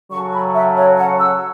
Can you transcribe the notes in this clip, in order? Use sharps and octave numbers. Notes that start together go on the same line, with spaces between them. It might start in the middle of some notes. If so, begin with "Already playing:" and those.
C#3 F#3 C#4 F#4 A4 C#6
B5
E5
C#5
F#5
E6